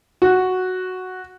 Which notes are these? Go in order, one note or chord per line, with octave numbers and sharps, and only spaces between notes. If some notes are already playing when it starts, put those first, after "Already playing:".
F#4